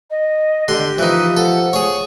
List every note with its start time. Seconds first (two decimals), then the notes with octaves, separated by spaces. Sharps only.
0.10 D#5
0.68 D3 G4 C6
0.98 E3 F3 D#4
1.37 A4 F#5
1.73 G#4 C#5